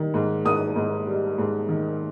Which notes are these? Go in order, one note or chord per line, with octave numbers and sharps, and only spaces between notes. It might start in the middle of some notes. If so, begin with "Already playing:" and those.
Already playing: D#3 G3
G#2
G#2 D#6
G#2
G3
G#2
D#3